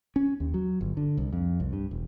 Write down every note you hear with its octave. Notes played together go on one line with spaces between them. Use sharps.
C#4
D#2
F#3
G1
D3
C2
F2
C2
G2
E1